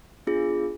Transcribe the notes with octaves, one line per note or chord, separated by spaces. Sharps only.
B3 D4 F4 G#4